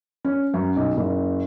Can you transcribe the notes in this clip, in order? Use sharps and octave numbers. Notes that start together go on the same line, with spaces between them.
C#4
F#2
B1
F#1